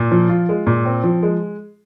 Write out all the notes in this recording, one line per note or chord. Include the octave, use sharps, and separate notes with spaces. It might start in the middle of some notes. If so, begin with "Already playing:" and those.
Already playing: A#2
F3
F4
G#3
A#2
C4
F3
G#3